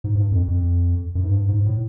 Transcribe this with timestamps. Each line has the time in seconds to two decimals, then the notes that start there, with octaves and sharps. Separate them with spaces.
0.04 G#2
0.15 G2
0.32 F2
0.48 F2
1.15 F#2
1.24 G#2
1.31 G2
1.48 G#2
1.65 A2